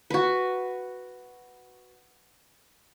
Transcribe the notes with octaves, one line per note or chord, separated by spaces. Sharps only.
F#4 B4